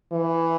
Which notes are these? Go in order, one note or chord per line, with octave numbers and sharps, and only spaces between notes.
E3